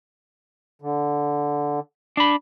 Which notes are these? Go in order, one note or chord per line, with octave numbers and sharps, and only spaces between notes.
D3
D4 B5